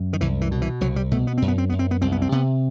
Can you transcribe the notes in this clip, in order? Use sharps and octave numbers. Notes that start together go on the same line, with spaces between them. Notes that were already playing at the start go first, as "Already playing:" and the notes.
Already playing: F#2
D#3
C2 E3
E3
B2
E3
C2 F#3
G3
B2 A3
B3
F#2 C4
B3
C4
F#2 B3
C4
B3
C2 C4
B3
C4
C3 B3